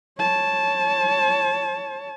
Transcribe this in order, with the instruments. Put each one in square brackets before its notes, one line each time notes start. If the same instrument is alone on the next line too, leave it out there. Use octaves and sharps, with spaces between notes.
[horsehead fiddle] C#5 A5